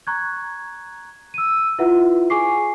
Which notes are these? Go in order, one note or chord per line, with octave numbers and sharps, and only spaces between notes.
A#5 C#6 F#6 G#6
E6 D#7
E4 F4 B4 E5 F#5
G#4 G#5 C#6 D6 C7